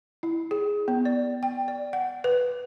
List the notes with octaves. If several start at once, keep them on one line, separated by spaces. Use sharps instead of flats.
E4
G#4
B3
D5
G5
D5
F#5
B4